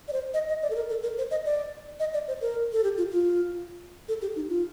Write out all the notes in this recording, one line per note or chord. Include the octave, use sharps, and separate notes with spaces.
D5
C5
D#5
D#5
D5
A4
A#4
A4
A#4
C5
D#5
D5
D#5
D5
C5
A#4
A4
G4
F4
F4
A4
G4
D#4
F4